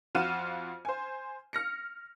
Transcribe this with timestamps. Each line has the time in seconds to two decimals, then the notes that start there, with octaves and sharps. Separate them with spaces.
0.15 F2 F4 F#4 F6 D#7 E7
0.85 C5 G#5
1.53 F6 A#6 C#7